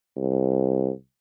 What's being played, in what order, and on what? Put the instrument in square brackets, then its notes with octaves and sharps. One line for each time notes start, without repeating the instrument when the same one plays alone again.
[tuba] C2